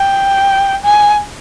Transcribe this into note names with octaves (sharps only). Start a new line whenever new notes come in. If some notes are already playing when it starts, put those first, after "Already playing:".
Already playing: G5
G#5